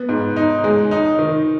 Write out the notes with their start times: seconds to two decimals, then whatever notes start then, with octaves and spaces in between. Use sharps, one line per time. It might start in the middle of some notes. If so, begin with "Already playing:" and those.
Already playing: B3
0.09 G#2
0.36 D#4
0.64 G#3
0.91 D#4
1.19 D#3